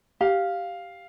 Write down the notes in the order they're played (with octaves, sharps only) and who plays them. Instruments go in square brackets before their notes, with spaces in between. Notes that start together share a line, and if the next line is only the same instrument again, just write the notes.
[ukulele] G4 [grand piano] F5